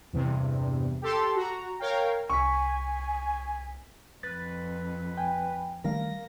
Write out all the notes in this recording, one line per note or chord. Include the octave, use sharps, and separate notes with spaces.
E2 G2 C3
G4 A4 C6
F#4 A#5
A#4 C#5 F5 G5
C2 G#5 C#6 B6
F2 B4 A6
G5 G#5
D#3 G3 A3 A#4 F5 A#6